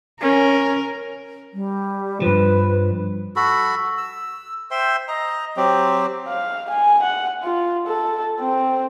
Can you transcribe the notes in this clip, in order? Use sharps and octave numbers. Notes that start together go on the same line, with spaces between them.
C#4 A#4
G3
G2 F3 B4
F#4 A4 B5
E6
C5 E5 G5 C6
D#5 A#5
F#3 C4 G4
F5
G#5
F#5
F4
A4
C4